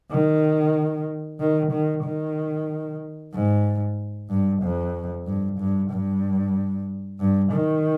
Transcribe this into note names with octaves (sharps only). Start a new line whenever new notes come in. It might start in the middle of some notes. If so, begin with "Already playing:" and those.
D#3
D#3
D#3
D#3
G#2
G2
F2
G2
G2
G2
G2
D#3